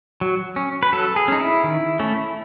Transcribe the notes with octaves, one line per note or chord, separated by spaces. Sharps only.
F#3
C#4
B4
F#3 A4
G#4
C#4 D#4
E4
D#3
A3 C#4